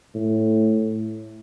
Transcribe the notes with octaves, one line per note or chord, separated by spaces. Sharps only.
A2